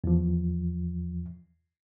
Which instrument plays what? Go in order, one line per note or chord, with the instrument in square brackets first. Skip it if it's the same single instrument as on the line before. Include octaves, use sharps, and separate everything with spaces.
[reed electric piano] E2 F3